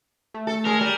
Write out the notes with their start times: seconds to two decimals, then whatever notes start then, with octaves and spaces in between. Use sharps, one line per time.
0.34 A3
0.47 A4
0.66 G#3 A#4
0.81 G3